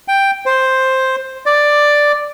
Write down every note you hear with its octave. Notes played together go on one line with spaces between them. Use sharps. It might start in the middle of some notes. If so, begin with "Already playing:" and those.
G5
C5
D5